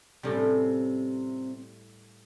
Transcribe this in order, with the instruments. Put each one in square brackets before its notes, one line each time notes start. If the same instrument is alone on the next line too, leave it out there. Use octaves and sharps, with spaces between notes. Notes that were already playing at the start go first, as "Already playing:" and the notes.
[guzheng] A2 G3 [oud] C3 C#4